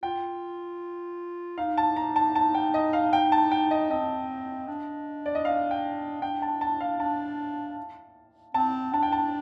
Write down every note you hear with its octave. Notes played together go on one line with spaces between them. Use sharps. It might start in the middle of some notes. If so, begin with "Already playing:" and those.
F4 G5
D#4 F5
A5
A#5
A5
A5
G5
D#5
F5
D#4 G5
A5
G5
D#5
C4 D#5
D4
D5
D#5
F5
G5
D4 G5
A5
A5
F5
D4 A5
C4 A5
D4 A5
G5
A5